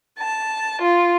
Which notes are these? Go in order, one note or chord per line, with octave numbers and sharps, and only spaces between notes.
A5
F4